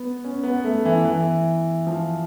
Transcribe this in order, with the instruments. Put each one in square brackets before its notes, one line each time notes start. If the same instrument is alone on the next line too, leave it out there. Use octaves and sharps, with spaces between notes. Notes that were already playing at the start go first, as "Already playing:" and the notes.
Already playing: [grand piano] B3
C#4
B3
A3
E3
E3
F3